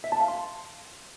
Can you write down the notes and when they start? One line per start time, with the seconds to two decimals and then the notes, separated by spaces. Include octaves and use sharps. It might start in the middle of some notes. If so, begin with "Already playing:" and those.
0.04 E5
0.12 A5
0.20 F5
0.28 C6